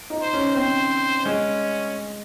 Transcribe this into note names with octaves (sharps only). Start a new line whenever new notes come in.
D#4
C5
C#4
C4 C5
G#3 C#4